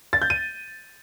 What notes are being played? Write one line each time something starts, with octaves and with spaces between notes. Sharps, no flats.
A6
G6
D#7